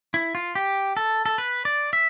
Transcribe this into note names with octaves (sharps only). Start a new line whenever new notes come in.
E4
F4
G4
A4
A4
B4
D5
E5